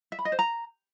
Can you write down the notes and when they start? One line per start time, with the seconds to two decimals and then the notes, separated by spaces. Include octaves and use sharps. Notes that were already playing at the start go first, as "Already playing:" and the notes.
0.12 E5
0.19 B5
0.25 D#5
0.32 C5
0.39 A#5